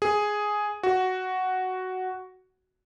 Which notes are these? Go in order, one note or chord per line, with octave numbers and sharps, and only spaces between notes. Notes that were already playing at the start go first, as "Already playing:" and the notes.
G#4
F#4